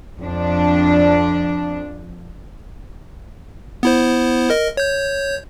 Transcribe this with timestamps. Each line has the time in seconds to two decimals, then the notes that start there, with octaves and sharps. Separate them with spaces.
0.20 F2 D4
3.83 B3 E4 C5
4.50 A#4 D#5
4.77 C#5 G6